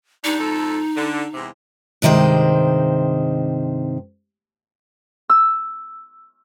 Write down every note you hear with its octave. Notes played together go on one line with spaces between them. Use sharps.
G2 D4 D#4
F2 G#2 A4
D3
E2 G#2 C3
G2 C3 D#3 G#3 C5
E6